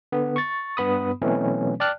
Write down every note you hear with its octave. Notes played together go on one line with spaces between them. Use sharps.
D3 B3
C#6 A6
G2 B3 B5 D#6
B2 E3 F#3 A3 C4 C#4
D5 G5 A5 F6 F#6